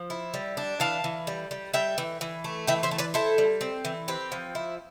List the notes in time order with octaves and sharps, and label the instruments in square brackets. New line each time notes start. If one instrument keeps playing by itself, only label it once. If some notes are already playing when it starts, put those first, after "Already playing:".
Already playing: [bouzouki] F3
E4
G3
D4
E3 F5 A5
E3
G3
G3
G3 E5 G5
E3
E3
A3
E3 E5 G5
C5 E5
A3
B4 D5
E4 A4 C5
G3
C4
E3
C4 G4 B4
F3
E4